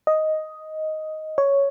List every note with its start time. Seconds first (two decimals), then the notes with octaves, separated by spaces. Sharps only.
0.07 D#5
1.38 C#5